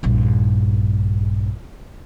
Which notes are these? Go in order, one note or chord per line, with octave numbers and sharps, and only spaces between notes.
A#1 G2